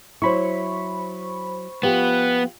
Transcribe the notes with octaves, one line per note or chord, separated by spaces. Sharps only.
F#3 E4 C5 B5 C#6
F3 B3 G4 G5